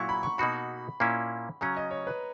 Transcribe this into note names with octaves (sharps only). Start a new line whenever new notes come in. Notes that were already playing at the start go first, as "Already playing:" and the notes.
Already playing: A#2 F#3 A#3 E4 F#5 A#5 C#6
B5
C#6
B2 A#3 D#4 F#4 B5
A#2 A#3 C#4 E4
C#3 F#3 C#4 A#5
D#5
C#5
B4